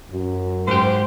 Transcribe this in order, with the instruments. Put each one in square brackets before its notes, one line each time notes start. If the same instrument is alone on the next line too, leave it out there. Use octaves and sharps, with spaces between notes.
[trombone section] F#2
[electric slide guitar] G#2 G4 [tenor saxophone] C5